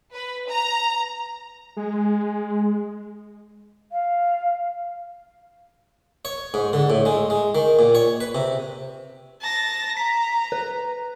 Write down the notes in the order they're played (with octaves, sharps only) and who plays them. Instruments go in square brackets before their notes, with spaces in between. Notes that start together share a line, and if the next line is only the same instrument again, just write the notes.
[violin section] B4
A#5
[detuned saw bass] G#3
[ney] F5
[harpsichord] C#5
G#2
D3
A2
G#3
G#3
D#3
A#2
C#5
B4
C3
[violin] A5 A#6
[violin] A#5 [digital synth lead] B6
[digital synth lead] B4